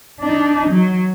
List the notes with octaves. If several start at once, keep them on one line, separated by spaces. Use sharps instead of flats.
D4 D#4
F#3